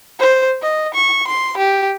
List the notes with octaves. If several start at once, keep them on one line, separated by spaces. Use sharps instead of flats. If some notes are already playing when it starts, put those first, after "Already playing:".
C5
D#5
C#6
C6
G4